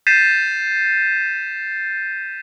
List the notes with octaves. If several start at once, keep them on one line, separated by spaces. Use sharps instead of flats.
G6 A6 B6 C7 D#7 E7